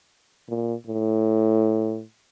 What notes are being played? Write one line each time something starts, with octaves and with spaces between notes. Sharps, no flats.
A#2
A2